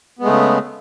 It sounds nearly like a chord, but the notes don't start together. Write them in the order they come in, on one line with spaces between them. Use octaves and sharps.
B3 G#3 A3 C#3